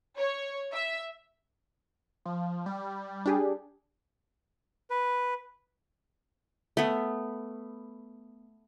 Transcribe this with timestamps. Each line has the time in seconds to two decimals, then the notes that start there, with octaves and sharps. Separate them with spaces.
0.18 C#5
0.73 E5
2.25 F3
2.66 G3
3.26 D4 G4 G#4
4.90 B4
6.77 A3 B3